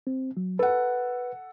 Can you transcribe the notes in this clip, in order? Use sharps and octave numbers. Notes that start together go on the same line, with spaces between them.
C4
F#3
A4 B4 F#5